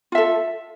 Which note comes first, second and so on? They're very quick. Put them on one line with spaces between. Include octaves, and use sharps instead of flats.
F4 E5 A4